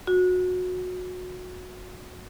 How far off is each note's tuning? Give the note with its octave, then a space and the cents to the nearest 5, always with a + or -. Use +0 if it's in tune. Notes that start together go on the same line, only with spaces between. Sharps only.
F#4 -20